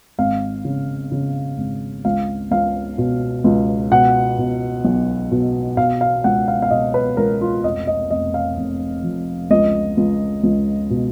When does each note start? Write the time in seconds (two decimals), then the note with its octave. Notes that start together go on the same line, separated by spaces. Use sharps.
0.18 G#1 F5
0.65 C#3
1.12 C#3
1.58 G#1
2.05 C#2 F5
2.51 C#2 F5
2.98 B2
3.44 C#2
3.91 B2 F#5
4.38 B2
4.85 B1
5.31 B2
5.77 B2 F5
6.01 F5
6.24 C#2 F#5
6.48 F5
6.62 F5
6.71 B2 D#5
6.94 B4
7.17 C#2 A#4
7.41 F4
7.64 F1 D#5
7.87 D#5
8.11 F1 D#5
8.34 F5
8.57 F1
9.03 F2
9.50 C#2 D#5
9.97 C#2
10.43 C#2
10.90 B2